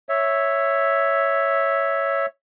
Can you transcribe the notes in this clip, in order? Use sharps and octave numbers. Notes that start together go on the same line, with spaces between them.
C#5 E5